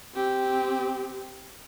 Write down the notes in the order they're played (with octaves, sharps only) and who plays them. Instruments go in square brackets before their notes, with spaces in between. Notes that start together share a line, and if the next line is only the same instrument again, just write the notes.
[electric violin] C4 G4